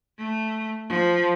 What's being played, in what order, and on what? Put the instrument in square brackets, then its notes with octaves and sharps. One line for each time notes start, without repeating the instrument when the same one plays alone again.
[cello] A3
F3